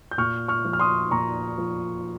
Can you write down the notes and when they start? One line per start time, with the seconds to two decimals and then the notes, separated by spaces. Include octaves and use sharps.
0.11 G6
0.18 A#2 C#6 F6
0.48 C#6 F6
0.65 F3
0.73 F6
0.80 C6 D#6
1.11 A#2 A#5 C#6
1.58 F3